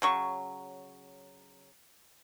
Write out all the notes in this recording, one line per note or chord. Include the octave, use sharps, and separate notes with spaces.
C#3 F#3 C#6